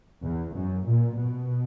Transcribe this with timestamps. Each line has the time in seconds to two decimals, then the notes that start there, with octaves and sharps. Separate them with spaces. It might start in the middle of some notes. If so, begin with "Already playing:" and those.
0.23 E2
0.54 F#2
0.86 A#2
1.18 B2